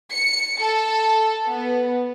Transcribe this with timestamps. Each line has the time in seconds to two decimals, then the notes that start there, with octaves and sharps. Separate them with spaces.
0.11 C#7
0.60 A4
1.47 B3